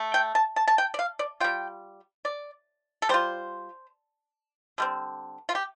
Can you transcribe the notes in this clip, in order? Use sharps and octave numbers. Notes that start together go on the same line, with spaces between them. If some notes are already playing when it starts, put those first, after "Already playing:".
Already playing: A3
G5
A5
A5
A5
G5
D5
F5
D5
G3 F4 G5
D5
A4
G3 F4 C5
D3 G3 C4
F4
G4